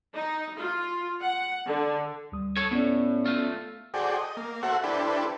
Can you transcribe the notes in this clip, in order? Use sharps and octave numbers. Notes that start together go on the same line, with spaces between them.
D#4
F4
F#5
D3
D2 G3 D#6
A4 C#5
A2 B3 C#4 D5
A3 F4
F#4 G#4 A4 C5 D5 G5
D#5
A#3
F#4 A4 C5 E5 F#5
D4 E4 G4 A4 B4 C5